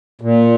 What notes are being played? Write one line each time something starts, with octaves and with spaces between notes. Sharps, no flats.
A#2